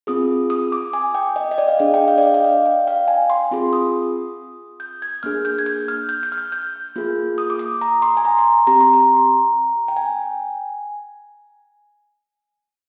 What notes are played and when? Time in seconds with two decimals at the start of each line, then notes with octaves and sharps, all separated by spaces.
0.07 C4 F4 G#4 D#6
0.50 D#6
0.72 D6
0.93 G#5
1.15 G5
1.36 D#5
1.51 D#5
1.58 D5
1.68 F5
1.79 D4 G#4 D#5
1.94 G5
2.08 F5
2.18 D5
2.23 D#5
2.34 G5
2.44 F5
2.66 G5
2.87 F5
3.08 G#5
3.30 C6
3.51 C4 F4 G#4
3.73 D#6
4.80 G6
5.02 G#6
5.23 A#3 D4 G#4 F6
5.45 G6
5.59 G#6
5.66 G6
5.88 F6
6.09 G6
6.23 G6
6.32 F6
6.38 G6
6.52 G6
6.96 A#3 F4 G#4
7.38 D#6
7.50 D6
7.59 D#6
7.81 A#5
8.02 C6
8.17 G#5
8.25 A#5
8.39 A#5
8.67 C4 G4 A#5
8.80 C6
8.94 A#5
9.88 G5
9.97 G#5